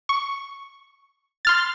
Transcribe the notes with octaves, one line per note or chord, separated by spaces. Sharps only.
C#6
C6 F6 A6